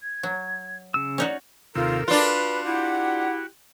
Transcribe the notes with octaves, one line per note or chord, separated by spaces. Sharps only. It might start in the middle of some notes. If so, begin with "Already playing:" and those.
G#6
F#3
C#3 E6
C#4 D#4 F#4 D5
D#2 C3 F4 A4 A#4 E6
D4 F4 F#4 B4
E4 G4 F#5